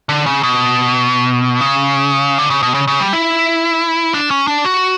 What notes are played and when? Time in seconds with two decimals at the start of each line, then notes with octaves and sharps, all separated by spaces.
0.09 D3
0.26 C#3
0.43 B2
1.61 C#3
2.38 D3
2.50 C#3
2.63 B2
2.74 C#3
2.88 C#3
3.00 G3
3.13 E4
4.14 D4
4.31 C#4
4.47 D4
4.65 F#4